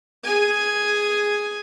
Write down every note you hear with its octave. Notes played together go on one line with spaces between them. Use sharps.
G#4 G#5